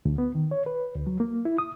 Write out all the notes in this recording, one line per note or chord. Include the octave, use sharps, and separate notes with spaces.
D2
B3
D#3
C#5
B4
D2
F#3
A#3
E4
D#6